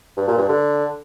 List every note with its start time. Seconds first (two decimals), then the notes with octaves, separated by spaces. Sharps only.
0.17 G2
0.27 A#2
0.38 G2
0.48 D3